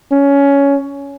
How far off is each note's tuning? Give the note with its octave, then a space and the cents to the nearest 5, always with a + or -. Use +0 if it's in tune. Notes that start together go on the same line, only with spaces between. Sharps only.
C#4 +15